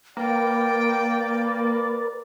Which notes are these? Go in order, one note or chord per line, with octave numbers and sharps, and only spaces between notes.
A#3 A#4 B4 D5 G5